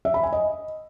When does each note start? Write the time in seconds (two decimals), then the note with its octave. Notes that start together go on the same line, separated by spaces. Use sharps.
0.05 E5
0.14 B5
0.23 G#5
0.32 D#5